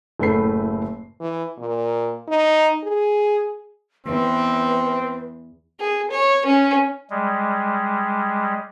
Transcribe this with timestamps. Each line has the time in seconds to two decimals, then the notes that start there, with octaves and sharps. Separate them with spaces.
0.20 F#1 A2 A3 B4 B5 C7
1.20 E3
1.58 A#2
2.28 D#4
2.83 G#4
4.06 E2 C4 B4
5.80 G#4
6.11 C#5
6.46 C#4
7.10 G3 G#3